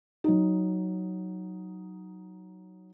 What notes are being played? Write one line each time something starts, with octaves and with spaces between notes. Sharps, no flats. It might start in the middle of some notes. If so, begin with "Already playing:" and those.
F#3 D#4